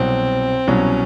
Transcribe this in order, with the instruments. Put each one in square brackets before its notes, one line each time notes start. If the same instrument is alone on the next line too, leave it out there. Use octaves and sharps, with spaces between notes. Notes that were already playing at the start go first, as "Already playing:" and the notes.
Already playing: [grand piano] C2 B2 F#3 [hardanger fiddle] C4
[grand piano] C2 B2 F#3 [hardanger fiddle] C#4